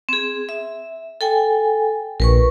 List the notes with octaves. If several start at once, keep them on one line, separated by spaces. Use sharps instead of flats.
C4 G#4
E5
A4 G5 G#5
A#1 A#4 B4 C#6